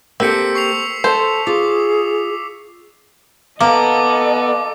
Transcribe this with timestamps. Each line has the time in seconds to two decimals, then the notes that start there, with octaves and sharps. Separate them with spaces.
0.20 A#3 C4 G4 A4 E6 B6 C#7
0.55 C#6 C7 F7
1.04 A4 C5 A5
1.47 F4 G#4 D6
3.61 A#3 B3 A4 D#5 D6